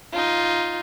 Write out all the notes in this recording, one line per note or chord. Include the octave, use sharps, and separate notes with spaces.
D#4 F4